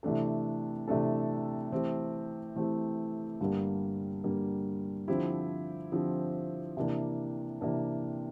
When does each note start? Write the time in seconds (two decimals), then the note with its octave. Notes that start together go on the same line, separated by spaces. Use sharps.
0.03 C3 E3 A3 D4 A4
0.88 C3 E3 A3 D4 A4
1.72 E3 A3 C4 G4
2.56 E3 A3 C4 G4
3.41 G2 D3 G3 A#3
4.24 G2 D3 G3 A#3
5.08 D3 F3 C4 E4 G4
5.92 D3 F3 C4 E4 G4
6.77 C3 E3 A#3 D4
7.61 C3 E3 A#3 D4